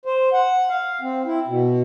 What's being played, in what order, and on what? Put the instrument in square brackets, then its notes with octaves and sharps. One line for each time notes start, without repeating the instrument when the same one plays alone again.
[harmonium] C5
F#5
F5
C4
E4
B2